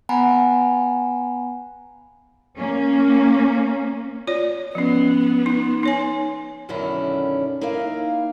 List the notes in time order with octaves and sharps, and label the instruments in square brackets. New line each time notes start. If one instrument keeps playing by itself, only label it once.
[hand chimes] B3 F#5 G#5 A#5 B5
[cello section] A#3 C#4
[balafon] F4 C#5 D5
[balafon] F3 C#4 [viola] B3
[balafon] D#4
D#4 C#5 G#5
[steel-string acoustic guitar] F#2 B2 D3 D#3 C#4 E4
A#3 D#4 E4 F5